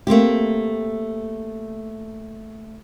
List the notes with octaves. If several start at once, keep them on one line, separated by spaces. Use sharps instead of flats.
A3 A#3 C4 G4